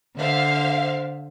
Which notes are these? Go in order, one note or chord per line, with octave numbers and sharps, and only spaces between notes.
D3 C5 E5 F5